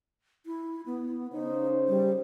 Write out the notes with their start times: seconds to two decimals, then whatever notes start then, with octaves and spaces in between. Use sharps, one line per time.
0.46 E4
0.86 B3
1.32 C#3 D#4 C5
1.88 G3